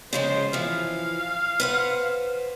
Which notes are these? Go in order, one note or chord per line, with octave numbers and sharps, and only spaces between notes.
C#3 F3 G#3 C5
E3 F3 F5
B4 C5 F#5